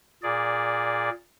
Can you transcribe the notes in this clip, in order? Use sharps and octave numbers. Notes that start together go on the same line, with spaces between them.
A#2 G#4 D5